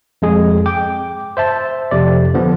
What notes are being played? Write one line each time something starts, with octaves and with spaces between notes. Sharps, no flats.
F2 G#3 G#4
G5 D6
C5 E5 A5
F2 C3 D5
D3 F3 B3